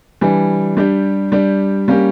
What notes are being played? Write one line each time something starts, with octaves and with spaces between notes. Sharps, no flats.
E3 G3 D4
G3 D4 G4
G3 D4 G4
G3 A#3 C#4 G4